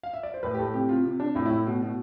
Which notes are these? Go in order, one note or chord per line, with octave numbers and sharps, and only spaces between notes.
F5
E5
D5
C5
A2 B4
G4
A2 A4
C3 G4
C3 F4
C3
C3 D4
A2 E4
A2 E4
B2
B2